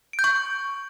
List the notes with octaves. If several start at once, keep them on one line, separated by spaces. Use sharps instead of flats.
D7
G6
C#6